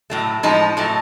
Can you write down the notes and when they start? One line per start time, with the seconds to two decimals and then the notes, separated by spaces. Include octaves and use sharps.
0.10 A2 F#3 A3
0.43 A2 F3 G#3 D#4
0.77 A2 F#3 A3